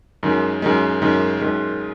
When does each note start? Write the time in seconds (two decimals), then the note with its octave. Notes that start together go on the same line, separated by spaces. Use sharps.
0.23 F#2 D#3 G#3
0.62 F#2 D#3 G#3
1.02 F#2 D#3 G#3
1.41 F#2 D#3 G#3